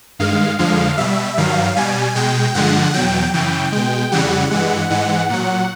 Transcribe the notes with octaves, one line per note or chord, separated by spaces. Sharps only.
G2 D#3 G#3 F5
F2 D3 F3 G#3 F5
B2 G3 E5
G2 D#3 F#3 F5
B2 G3 G#5
B2 G#3 G5
G2 D3 F3 G#3 F#5
E2 B2 F#3 G5
F#2 C#3 E3 G5
B2 G#3
F2 C#3 E3 G3 F#5
G2 E3 G#3
G#2 E3 G#3
A#2 F#3 F#5